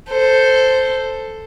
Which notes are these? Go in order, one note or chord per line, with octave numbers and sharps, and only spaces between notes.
A4 C5